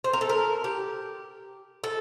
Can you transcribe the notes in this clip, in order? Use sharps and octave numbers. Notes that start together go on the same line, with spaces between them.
C5
A#4
A4
A#4
G4
A4